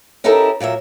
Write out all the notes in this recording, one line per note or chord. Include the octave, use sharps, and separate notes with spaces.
C#4 D#4 E4 G4 A4 A#4
A#2 F#3 A#3 E5